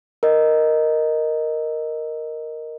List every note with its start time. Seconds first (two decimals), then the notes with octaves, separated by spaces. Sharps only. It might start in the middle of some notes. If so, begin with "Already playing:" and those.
0.23 A#4 D#5